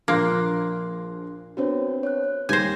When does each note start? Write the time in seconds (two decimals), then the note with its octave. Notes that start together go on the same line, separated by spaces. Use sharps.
0.08 A#1 F3 A#3 D4 C6 F#6
1.57 B3 C4 D4 F#4 C#5
2.03 C#5 F#6
2.49 D#2 G3 C5 G#5 G6 A#6